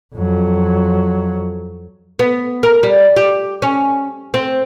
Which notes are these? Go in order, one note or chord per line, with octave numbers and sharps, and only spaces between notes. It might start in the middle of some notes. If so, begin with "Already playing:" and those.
F2 F#3
B3
A#4
G3
G4
C#4
C4